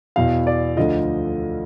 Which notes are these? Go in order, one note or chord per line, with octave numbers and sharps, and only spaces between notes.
E2 B2 F5
D5
D2 D3 F3 D#5